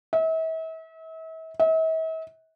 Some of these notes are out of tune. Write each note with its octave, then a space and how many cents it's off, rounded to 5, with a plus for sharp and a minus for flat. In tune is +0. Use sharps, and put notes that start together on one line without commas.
E5 -40
E5 -45